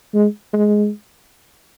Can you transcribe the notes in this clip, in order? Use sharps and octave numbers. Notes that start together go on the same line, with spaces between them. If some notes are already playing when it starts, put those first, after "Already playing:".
G#3
G#3